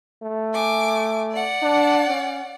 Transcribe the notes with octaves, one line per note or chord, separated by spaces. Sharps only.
A3
G#5 D6
D5 F#5
D4
C#4